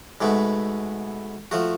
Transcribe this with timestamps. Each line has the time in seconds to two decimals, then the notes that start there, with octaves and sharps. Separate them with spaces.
0.21 G#2 B2 A3 B3
1.51 F3 A3 F#4